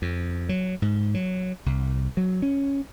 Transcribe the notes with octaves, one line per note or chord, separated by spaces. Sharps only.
F2
F#3
G#2
F#3
C2
F#3
C#4